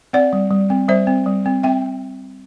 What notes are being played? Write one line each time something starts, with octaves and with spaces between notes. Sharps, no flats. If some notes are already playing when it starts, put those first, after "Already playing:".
C4 D5 F#5
G3
G3
C4
G3 C5 E5
C4
G3
C4
C4 E5 G5